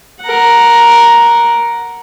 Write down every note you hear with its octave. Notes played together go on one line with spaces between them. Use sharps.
A#4 F#5